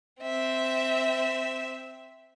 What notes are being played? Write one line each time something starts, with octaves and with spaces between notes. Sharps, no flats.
C4 E5